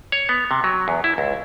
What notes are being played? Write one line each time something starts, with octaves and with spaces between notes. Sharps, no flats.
C#5
B3
C3
F#3
E2
E4
C#2